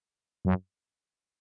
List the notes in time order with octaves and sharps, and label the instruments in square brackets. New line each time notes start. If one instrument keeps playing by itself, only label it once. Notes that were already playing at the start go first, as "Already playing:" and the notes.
[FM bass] F#2